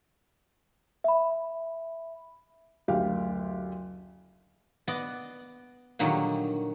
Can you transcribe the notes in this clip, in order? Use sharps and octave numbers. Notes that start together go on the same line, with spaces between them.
E5 B5
F#1 D2 G4 F5
B3 D5 D#5
A#2 D3 D#3 F#3 G3